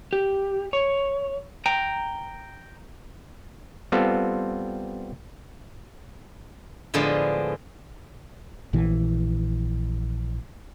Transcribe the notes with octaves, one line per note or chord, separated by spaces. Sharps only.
G4
C#5
G5 A#5
G3 B3 C4 F4 A4
A2 D3 F3 G#3 B3
A#1 E3